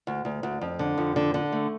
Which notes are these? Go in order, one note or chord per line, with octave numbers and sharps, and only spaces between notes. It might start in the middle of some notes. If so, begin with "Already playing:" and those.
D2
D2
D2
F2
D3
F2
D3
D3
A3